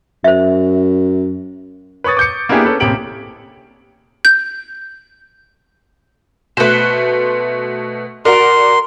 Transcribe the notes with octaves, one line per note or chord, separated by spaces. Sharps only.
F#2 C5 E5
B4 C#5 C#6 D#6 A6
D6 G6 C#7
A#3 B3 D4 E4 G4 G#4
C#4 A4 B4
A1 C3 A#3 G4 D7 F#7
G6
B2 A3 B4 C5
F#4 A#4 D5 C6